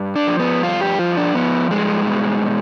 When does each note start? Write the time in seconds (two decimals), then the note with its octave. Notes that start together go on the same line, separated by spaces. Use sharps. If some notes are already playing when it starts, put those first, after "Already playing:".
Already playing: G2
0.16 D4
0.27 F3
0.39 B3
0.63 G2 F4
0.81 G4
0.99 F3 F4
1.17 D4
1.35 F3 B3
1.71 G2 G#3
2.06 B2
2.43 B2